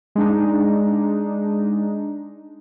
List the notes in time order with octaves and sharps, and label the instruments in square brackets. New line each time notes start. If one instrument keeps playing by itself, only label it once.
[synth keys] G#3 D4 D#4